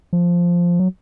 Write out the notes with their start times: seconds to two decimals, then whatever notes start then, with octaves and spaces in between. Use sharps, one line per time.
0.13 F3
0.80 F#3